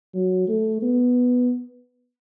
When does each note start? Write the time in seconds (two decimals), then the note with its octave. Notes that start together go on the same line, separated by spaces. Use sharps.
0.14 F#3
0.48 A3
0.82 B3